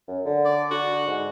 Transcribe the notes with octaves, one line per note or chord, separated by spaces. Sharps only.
F#2
D3
D5
D3 F#4
G#2